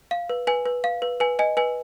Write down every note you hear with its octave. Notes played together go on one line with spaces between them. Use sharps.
F5
B4
B4 G#5
B4
F5
B4
B4 G#5
D#5 G#5
B4 G#5